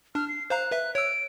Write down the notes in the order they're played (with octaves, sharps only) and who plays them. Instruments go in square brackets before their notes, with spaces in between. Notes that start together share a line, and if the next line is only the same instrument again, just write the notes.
[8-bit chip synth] D4 [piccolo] F6
[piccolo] C7
[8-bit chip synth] C5 F5 A#5 [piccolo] F#6
[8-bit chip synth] B4 E5
[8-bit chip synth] C#5 E6 [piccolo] D7